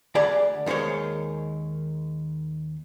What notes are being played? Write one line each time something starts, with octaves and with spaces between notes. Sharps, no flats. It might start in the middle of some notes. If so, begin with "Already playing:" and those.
D2 G4 G#4 D5 B5
D#2 D#3 G#3 C5 C#5